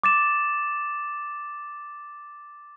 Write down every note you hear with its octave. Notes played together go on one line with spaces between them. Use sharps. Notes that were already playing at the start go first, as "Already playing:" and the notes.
D6 A6 E7